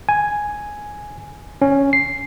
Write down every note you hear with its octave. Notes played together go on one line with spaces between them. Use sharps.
G#5
C#4
C7